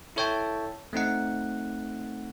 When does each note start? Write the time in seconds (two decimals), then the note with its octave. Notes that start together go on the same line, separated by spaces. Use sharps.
0.16 E4 A4 C#5 E5 G5 A5
0.93 A3 C4 D#4 F#5